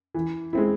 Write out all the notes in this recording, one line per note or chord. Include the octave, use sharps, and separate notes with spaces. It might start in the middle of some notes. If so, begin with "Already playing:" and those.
E3
G#3 C4 E4